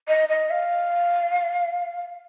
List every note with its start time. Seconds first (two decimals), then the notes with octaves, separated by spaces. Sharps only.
0.08 D#5
0.29 D#5
0.50 F5